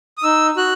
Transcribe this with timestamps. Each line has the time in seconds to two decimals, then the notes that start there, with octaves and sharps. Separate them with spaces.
0.18 D#6
0.23 D#4 E6
0.57 F#4 F#6